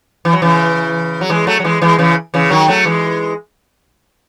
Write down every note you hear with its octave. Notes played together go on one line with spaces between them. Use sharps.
E3
F#3
C#3 E3
F#3
E3 G#3
F#3 A3
F#3
E3 G#3
E3 G#3
C#3 E3
C#3 E3
D#3 F#3
F#3 A3
E3 G#3